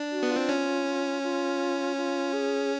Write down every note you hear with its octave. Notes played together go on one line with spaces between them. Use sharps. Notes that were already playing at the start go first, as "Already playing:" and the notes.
Already playing: D4
F#4
B3
F4
C4
C#4
F4
F4
G#4